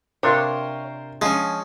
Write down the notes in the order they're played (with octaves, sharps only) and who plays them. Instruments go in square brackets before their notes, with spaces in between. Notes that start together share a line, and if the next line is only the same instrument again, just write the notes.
[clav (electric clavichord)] C3 D4 [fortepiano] F4 A#4 C5 [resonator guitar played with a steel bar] C#5
[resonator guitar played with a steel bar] F3 C#4 [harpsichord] G#3